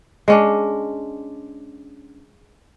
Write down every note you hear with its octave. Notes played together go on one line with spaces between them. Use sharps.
G#3 C#4 D4